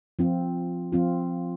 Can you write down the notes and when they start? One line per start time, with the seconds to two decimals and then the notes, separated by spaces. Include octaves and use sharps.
0.19 F3 C4 F4
0.92 F3 C4 F4